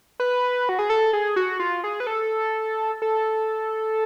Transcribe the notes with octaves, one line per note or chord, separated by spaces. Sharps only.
B4
F#4
G#4
A4
G#4
F#4
F4
G#4
B4
A4
A4